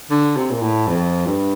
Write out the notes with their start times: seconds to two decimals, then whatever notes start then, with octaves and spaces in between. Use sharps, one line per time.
0.10 D3
0.36 C3
0.51 A#2
0.61 A2
0.87 F2
1.26 G2